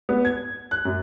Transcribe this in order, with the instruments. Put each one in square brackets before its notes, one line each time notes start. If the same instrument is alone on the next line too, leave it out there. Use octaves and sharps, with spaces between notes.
[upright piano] B3
G#6
F#6
F#2